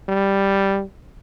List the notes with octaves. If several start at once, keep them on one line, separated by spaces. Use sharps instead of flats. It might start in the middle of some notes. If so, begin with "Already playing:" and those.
G3